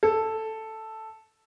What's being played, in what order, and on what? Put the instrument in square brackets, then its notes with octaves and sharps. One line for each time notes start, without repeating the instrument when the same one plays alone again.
[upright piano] A4